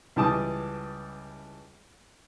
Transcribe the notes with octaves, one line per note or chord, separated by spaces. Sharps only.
C#2 E3 G3 A5 D6 D#6